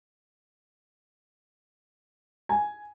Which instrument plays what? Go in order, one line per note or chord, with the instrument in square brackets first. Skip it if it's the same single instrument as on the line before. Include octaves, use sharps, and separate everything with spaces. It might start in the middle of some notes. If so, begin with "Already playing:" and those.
[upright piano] G#5